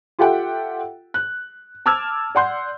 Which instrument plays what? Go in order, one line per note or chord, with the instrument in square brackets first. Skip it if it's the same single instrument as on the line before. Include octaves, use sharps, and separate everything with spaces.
[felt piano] F4 G4 A4 E5 F#5 G5
F#6
A5 D6 E6 F6 G#6
D5 F#5 C6 G6